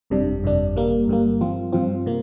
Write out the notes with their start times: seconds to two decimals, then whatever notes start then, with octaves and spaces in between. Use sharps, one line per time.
0.10 G1 F2 C3 G3 D4
0.43 G1 F2 C3 G3 D4
0.76 G1 G2 G3 A#3
1.08 G1 G2 G3 A#3
1.41 G2 F3 C4 F4
1.72 G2 F3 C4 F4
2.06 C3 A#3